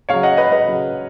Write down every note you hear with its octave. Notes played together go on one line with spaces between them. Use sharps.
C#3 F#3 C#5 F5
D#5 F#5
B4 D#5
B4 D#5
C#3 F#3